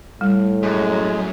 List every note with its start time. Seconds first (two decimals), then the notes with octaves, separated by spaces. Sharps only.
0.21 A2 G3
0.63 F#2 G#3